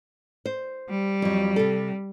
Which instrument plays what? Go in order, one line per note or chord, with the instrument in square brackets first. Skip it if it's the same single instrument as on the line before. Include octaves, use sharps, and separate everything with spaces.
[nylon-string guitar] C5
[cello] G3
[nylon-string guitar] F2 F#3
C3 A4